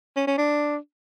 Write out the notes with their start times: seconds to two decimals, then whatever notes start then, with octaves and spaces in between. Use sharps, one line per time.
0.16 C#4
0.27 C#4
0.38 D4